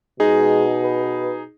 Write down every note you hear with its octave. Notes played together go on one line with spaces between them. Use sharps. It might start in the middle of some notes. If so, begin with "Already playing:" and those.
B2 G#3 D#4 G#4
B4